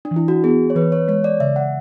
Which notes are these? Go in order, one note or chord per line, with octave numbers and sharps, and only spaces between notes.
D4
E3
E4
F#4
B3 G#4
C#5
E3 B4
C#5
G#3 C#5
D5
C#3 E5
F#5